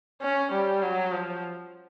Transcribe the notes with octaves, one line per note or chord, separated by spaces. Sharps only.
C#4
G3
F#3
F3